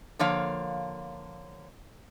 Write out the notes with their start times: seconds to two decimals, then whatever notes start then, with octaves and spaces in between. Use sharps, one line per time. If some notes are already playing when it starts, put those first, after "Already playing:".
0.19 D3 F3 A#3 C#5 F5